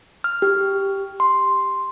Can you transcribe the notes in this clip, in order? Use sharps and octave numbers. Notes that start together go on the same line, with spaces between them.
F6
G4
C6